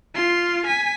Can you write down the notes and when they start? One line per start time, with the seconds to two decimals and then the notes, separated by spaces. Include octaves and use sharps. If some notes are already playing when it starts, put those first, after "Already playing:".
0.15 F4 C6
0.66 G#5 B6